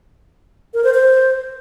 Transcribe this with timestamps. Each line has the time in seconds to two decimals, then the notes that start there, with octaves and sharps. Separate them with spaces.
0.74 A#4
0.84 C5
0.94 C5